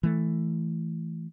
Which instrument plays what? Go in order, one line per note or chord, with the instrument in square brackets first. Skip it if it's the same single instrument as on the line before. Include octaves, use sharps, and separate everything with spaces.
[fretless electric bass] E3 A3